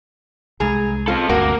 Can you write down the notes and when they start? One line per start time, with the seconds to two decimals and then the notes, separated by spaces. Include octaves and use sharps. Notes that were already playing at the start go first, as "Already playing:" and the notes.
0.60 C2 G2 G#3 G#4 A#5
1.08 C4 F4 A4
1.29 G1 D2 C3 A#3 F#4 A#4